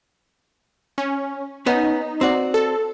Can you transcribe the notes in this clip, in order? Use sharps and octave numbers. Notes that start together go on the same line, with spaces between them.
C#4
B3 C#4 D#4
C4 F#4 D5
A4